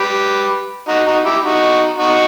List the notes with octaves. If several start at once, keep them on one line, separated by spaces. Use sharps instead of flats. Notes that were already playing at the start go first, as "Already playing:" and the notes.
Already playing: G4 B4
D#4 F#4
D#4 F#4
E4 G4
D#4 F#4
D#4 F#4